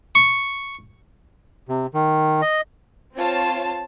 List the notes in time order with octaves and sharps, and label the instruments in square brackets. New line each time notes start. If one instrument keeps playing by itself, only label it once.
[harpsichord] C#6
[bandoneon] C3
D#3
D#5
[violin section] C4 F4 C#5 A5